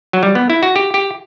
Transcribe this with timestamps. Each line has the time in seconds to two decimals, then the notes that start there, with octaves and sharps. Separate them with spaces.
0.13 F#3
0.23 G3
0.35 B3
0.50 E4
0.63 F#4
0.76 G4
0.94 G4